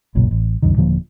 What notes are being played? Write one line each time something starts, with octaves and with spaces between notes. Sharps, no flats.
F#1 B1 A#2
A1
C#2 F#2 D3 D#3
D#1 D3 F3 A#3